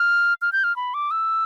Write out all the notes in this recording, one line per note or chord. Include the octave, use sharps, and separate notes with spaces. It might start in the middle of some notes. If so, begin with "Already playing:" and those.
Already playing: F6
F6
G6
F6
B5
D6
E6